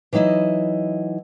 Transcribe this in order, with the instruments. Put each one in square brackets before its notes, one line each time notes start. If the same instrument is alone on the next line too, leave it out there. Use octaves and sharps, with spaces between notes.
[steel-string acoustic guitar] E3 F#3 D#4 E4 D#5